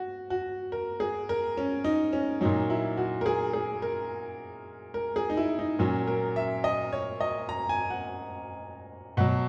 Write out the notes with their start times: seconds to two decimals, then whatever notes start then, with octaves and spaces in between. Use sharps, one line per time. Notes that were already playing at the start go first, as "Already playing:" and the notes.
Already playing: F#4
0.30 F#4
0.72 A#4
1.00 G#4
1.29 A#4
1.57 C#4
1.84 D#4
2.13 C#4
2.41 A#2 F#3 D#4
2.70 E4
2.97 F#4
3.21 A#4
3.26 G#4
3.53 G#4
3.82 A#4
4.94 A#4
5.16 G#4
5.30 D#4
5.37 E4
5.59 D#4
5.79 A#2 F#3 C#4
6.07 A#4
6.36 E5
6.64 D#5
6.93 C#5
7.21 D#5
7.49 A#5
7.69 G#5
7.90 F#5
9.17 B2 F#5
9.20 F#3